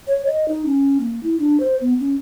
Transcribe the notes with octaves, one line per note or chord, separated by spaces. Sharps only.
C#5
D#5
D#4
C#4
A#3
E4
D4
C5
B3
C#4